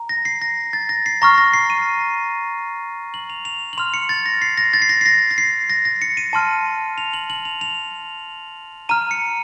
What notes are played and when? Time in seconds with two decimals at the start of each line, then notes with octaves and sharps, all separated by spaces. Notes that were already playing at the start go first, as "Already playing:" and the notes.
Already playing: A#5
0.09 A#6
0.25 C7
0.42 A#6
0.73 A6
0.89 A#6
1.06 C7
1.22 A#5 C#6 F6 A#6
1.38 A#6
1.53 C7
1.70 D#7
3.14 F#7
3.30 F7
3.45 F7
3.73 F#7
3.78 C6 F6 F7
3.94 C#7
4.09 A6
4.26 A#6
4.42 C7
4.57 A#6
4.74 A6
4.82 C7
4.89 A#6
5.01 C7
5.06 A#6
5.31 A#6
5.38 C7
5.70 A#6
5.85 A#6
6.02 C#7
6.17 D#7
6.33 A5 C6 F6
6.98 F7
7.14 F#7
7.30 F#7
7.45 F7
7.61 F7
8.89 A#5 F6 D#7
9.11 C#7